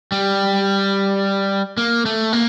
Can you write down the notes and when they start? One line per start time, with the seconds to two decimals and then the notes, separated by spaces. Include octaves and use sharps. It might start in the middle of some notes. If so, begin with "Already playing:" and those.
0.12 G3
1.77 A#3
2.06 A3
2.33 A#3